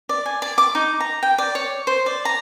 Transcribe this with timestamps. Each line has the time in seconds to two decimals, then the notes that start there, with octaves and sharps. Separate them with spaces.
0.09 D5
0.26 G#5
0.42 D5
0.58 D6
0.75 D#4
1.00 A#5
1.23 G5
1.38 D5
1.55 C#5
1.87 C5
2.06 D5
2.25 A#5